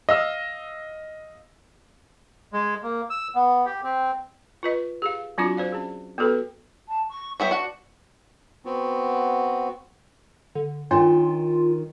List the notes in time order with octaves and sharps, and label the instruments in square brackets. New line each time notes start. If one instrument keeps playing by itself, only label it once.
[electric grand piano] D#5 F5 E6
[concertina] G#3
A#3
E6
B3
G4
C4
[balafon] F4 B4 D#5
G4 G#4 F5
F#3 C4 D4 F4 F#4 D6
C5 D5 F5
C#4 G#4
B3 F#4 G4 A4 B4
[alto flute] A5
C#6
[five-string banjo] F#3 B3 E5 [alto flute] G5
[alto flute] D4 [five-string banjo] F#4 F#5
[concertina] B3 C4 F#4
[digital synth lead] D3
[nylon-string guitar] D#3 D#4 [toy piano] D4 C#5 G5 [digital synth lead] F4